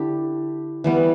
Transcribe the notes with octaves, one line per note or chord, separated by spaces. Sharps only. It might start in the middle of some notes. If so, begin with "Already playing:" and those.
Already playing: D3 D4 E4 G4
E3 G3 B3